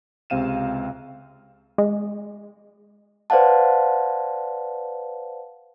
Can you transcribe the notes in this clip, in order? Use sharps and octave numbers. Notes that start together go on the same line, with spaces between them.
C#2 C3 C4 F5 D#7 E7
G#3
B4 C5 D5 F5 F#5 A5